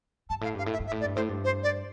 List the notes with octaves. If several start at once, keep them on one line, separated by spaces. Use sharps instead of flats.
G2 A5
A2 F5
G2 F5
A2
E5
G2
E5
A2
D5
G2
A2 C5
G2
C5
D5